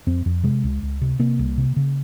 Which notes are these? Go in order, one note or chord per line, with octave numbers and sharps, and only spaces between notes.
F2 C4
F2
C3 G#3
C#2
C#2
C3
C3 A#3
C2
C3
C#3